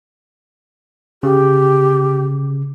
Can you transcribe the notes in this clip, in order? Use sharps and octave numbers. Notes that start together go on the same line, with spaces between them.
C#3 G4